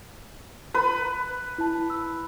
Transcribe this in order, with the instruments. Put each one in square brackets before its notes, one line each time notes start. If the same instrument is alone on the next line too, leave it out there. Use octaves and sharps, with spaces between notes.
[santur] B4
[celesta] E4 A5
E6